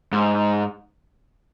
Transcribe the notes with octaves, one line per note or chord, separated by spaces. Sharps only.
G#2